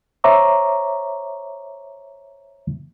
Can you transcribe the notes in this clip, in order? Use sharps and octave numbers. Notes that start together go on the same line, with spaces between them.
C5 C#5 E5 A#5 C#6 D6